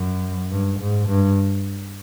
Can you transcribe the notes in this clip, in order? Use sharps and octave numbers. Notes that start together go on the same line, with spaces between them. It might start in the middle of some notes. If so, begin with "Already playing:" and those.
Already playing: F#2
G2
G#2
G2